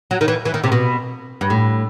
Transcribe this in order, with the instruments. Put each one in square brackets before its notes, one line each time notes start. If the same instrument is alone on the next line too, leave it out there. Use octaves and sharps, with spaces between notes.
[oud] F#3
D#3
E3
E3
D#3
C3
B2
G2
A2